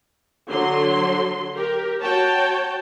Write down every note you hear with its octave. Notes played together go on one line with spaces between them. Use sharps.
D3 F#3 C6
G4 A#4
F#4 C#5 G5 A5